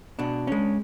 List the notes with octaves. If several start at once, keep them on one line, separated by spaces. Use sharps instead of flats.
B2 D4
G#3 C#4